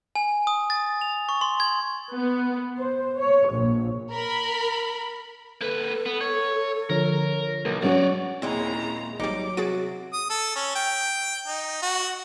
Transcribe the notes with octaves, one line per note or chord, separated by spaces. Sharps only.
G#5
D#6
A6
F7
C#6
C6
G#6
B3
C5
C#5
A#1
A#4 B5
A#3 A4 B4
B3
C#5
D3 F3 A#4 C#5
B1 A#3
F#3 C#4 F#4 C#5 D5 F#5
D#2 A#2 C#3 G#3 C4 E4 A#5
G#1 F#3 G3 D#4 D6
C3 F#4 G#4 A6 D7
D#6
A4
C#4
G5
D#4
F#4